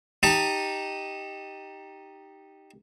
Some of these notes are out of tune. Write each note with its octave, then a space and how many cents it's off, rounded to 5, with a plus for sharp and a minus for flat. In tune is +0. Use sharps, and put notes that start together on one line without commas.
D#4 +0 G4 +0 A5 +20